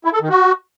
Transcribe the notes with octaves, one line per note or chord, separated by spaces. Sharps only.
E4
A4
D#3
F#4